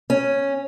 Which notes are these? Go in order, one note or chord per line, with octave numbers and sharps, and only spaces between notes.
C#4